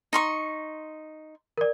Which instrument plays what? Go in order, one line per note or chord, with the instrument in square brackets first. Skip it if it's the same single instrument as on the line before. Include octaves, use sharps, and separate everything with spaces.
[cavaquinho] D#4 C6 C#6
[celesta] A#4 D5